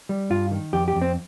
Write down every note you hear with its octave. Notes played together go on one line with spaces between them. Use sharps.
G3
G2 F4
D#3
F2 G4
G4
F2
C4